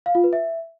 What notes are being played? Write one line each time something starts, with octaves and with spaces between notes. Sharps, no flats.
F5
F4
B4
E5